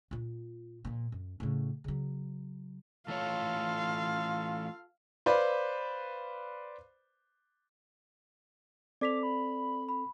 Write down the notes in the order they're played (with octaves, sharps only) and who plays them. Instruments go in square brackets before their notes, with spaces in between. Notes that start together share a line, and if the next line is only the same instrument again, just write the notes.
[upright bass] A#2 F4
A#2 F3
F#2
A2 C#3
C#3 F#3
[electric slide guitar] E3 A3 C#5 [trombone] F4 [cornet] A4 [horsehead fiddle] F5
[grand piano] B4 C5 D5 F5 B5
[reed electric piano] C4 A4 [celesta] D5 B6 F7 [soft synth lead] D6
[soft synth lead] B5
[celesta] B5